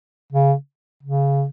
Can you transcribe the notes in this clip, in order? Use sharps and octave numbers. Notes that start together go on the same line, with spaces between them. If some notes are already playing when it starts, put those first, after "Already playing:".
C#3
C#3